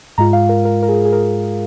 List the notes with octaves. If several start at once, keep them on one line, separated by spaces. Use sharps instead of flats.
G#2 G#3 F4 A#5
F5
A#4
A#4
A#4
G#4
G#4
A#4